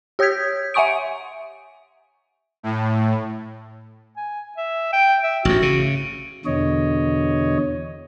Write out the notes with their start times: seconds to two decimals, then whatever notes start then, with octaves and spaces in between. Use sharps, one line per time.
0.19 G4 C#5 D#6 G6 G#6 B6
0.74 E5 F#5 G#5 C#6 D#6 D7
2.63 A2
4.17 G#5
4.57 E5
4.93 G5
5.24 E5
5.45 A1 G#2 F#4
5.62 C#3
6.46 E2 B2 D3 C#5 D#5